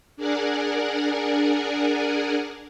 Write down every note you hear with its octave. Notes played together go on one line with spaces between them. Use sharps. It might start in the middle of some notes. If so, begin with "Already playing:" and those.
D4 G#4 A#4 D5 F#5 G#5